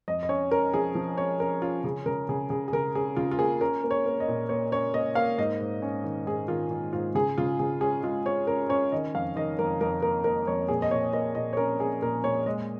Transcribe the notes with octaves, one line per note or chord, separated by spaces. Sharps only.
F2 D#5
D#5
C#4 C#5
C#4 A#4
F3 G#4
F3
C#4 C#5
C#4 A#4
C#4 F4
C#3 G#4
C#3 A#4
C#3 G#4
C#3 G#4
G#4
C#3 A#4
C#4 G#4
C#3 F4
F4
A#3 G#4
C#4 A#4
A#3
C#5
A#3
D#5
A#2
A#3 C#5
C#4 C#5
A#3 D#5
A#3 F5
G#2 D#5
G#2
C#4
D#3
G#2 G#4
D#3 F4
D#3
G#2 F4
C#3 G#4
C#3 F4
C#3 G#4
C#4 G#4
G#3 F4
C#4 C#5
C#4 A#4
C#4 C#5
D#3 D#5
F2 F5
D#3 D#5
F2 A#4
F2 A#4
A#3 A#4
A#3 A#4
F2 C#5
A#2 G#4
D#5
A#2 C#5
A#3 D#5
A#2 D#5
C#5
C#4 A#4
C#4 G#4
A#2 A#4
A#2 C#5
G#3 D#5